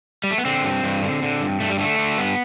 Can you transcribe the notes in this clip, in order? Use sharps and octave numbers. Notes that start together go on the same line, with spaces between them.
G3
A3
B3
D3 C4
G2
G2
D3
D3
G2
G2 A3
G3
D3 A3
D3
G2 B3